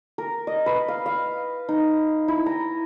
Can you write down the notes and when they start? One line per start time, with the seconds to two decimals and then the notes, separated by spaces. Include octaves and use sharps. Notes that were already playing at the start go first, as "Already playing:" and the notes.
0.18 A#4
0.47 D#5
0.66 B4
0.88 F5
1.06 F5
1.69 D#4
2.28 E4
2.46 A#5